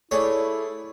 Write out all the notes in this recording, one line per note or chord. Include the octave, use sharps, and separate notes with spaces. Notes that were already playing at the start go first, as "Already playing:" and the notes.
A3 E4 G#4 C#5 D5